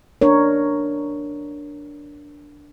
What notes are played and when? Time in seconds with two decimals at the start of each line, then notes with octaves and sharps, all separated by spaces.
0.22 D4 A#4 C#5